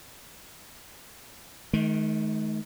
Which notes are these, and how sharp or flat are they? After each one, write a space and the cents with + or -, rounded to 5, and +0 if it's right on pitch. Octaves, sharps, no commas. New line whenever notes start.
D#3 +15 A3 -45